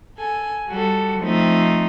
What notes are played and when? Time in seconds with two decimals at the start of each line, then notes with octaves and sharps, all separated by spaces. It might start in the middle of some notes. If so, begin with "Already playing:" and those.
0.18 A4 G#5
0.67 G3 F#4 A4
1.21 F3 A3 C4 D#4